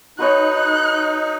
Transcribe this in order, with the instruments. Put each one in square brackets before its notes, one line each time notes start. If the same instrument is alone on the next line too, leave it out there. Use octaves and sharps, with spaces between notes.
[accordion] D#4 [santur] F#4 B4 C#5 [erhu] F#6